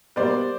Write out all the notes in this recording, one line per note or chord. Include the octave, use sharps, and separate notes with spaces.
B2 G3 A#3 C5 D5